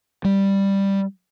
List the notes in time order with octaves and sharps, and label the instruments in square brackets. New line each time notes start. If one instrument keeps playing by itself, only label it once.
[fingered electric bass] G3